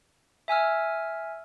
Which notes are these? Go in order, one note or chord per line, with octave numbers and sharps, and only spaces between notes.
E5 G#5 E6 F6